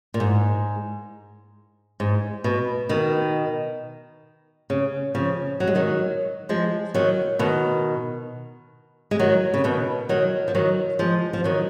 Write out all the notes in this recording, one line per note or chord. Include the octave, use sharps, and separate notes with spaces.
A#2
G#2
G#2
B2
B2 D#3
C#3
C#3 F3
F#3
G#3
D#3 F#3
F3 G#3
D#3 F#3
B2 D#3
G#3
D#3 F#3
C#3
B2 D#3
D#3 F#3
F3
D#3 F#3
F3 G#3
F3
D#3 F#3